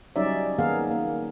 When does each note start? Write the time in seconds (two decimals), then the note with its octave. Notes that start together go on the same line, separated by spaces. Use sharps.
0.16 F#3 G3 C#4 D#4 D5 E5
0.59 D#3 A#3 B3 G#4 A#4 F5
0.91 A#3